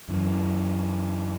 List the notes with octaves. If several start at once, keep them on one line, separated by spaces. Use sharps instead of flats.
F#2 E3